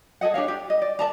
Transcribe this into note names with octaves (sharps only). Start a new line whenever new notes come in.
G#4 A4 D#5 F#5
D4 G4 C#5 F5
G4
D#5
D5
D5 D#5 A5 A#5